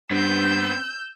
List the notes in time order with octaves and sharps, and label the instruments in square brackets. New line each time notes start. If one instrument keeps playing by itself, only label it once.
[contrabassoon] G2 [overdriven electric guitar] B3 C4 [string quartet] E6 G6